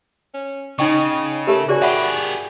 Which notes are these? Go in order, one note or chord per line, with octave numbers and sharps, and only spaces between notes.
C#4
C#3 D#4 D#5 G5 C#6
A3 G4 A#4 E5
F#4 G#4 D5 G#5
G4 G#4 E5 F#5 B5